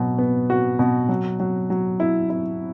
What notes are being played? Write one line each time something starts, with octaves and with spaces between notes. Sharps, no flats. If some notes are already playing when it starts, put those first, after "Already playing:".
Already playing: B2 F#3
B3
F#4
B2
F#3
F#3
F#3
E4
E4